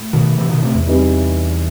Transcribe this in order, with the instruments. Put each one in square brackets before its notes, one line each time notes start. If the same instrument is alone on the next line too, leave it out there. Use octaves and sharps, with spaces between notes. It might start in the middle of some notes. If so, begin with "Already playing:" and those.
Already playing: [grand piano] A2
[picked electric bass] B2 D#3
C3 E3
B2 D#3
A2 C3
E2
[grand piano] C3 E3 G3 D#4